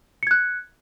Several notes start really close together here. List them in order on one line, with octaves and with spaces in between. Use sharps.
C#7 G#6 F#6